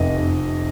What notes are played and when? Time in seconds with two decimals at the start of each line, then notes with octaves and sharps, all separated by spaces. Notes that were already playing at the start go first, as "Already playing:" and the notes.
Already playing: F1 C3 D#5
0.17 F1